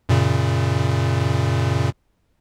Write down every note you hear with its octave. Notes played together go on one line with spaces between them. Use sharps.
F#2 A#2 C#3